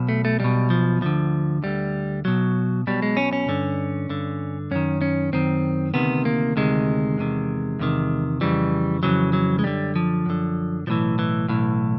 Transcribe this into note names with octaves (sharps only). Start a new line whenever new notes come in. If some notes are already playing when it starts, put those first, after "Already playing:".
Already playing: B1 B2
A3
A3
B1 B2 G3
F3
D2 D3 F3
D2 D3 G3
B1 B2 F#3
B1 B2 G3
G#3
C#4
C#4
G2 D3
G2 D3
F#2 D#3 C#4
C#4
F#2 D#3 C4
D2 C3 D#3 B3
A#3
D2 C3 D#3 G#3
E2 C3 D#3
E2 C3 D#3
F2 C#3 E3 G3
F2 C#3 E3 F#3
F#3
G#3
F#2 D3 G3
F3
F#2 D3
B1 A2 E3 F3
E3
B1 A2 E3